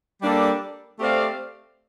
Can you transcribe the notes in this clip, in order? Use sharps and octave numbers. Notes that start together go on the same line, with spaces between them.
G3 A#3 D4 A4 D5
A3 C4 G4 D5 F5